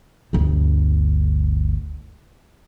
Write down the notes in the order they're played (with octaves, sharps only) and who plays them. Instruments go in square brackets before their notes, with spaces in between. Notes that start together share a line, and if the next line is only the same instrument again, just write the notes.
[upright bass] G1 D2